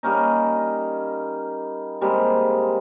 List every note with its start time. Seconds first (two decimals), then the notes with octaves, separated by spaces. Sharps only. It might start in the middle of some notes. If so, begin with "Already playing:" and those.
0.03 G3 A#3 C#4 D#4
2.01 C3 G3 G#3 A#3